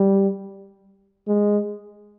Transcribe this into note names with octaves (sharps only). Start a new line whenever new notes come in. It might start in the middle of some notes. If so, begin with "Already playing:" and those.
Already playing: G3
G#3